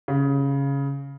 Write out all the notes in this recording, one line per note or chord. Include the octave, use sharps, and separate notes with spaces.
C#3